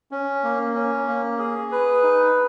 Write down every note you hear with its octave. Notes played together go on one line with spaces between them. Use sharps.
C#4
A#3
C#4
A#3
G#4
B4
D#4